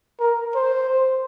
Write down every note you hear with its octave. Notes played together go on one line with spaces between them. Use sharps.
A#4
C5